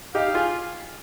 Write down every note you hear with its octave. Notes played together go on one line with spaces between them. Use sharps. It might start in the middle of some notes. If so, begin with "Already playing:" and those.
D#4 G4 F5
F4 G#4